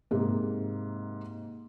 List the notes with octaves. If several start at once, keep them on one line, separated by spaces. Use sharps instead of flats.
G#2 C3 A#3